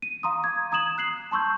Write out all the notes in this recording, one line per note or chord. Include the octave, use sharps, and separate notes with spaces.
D#7
F5 A#5 C6 D#6
D6 G#6
A#5 D#6 G#6 E7 F#7
F#6 C7 F#7
A5 C6 C#6 E6 G6